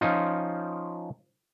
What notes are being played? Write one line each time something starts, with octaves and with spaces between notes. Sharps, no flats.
F3 C#4 D#4 F4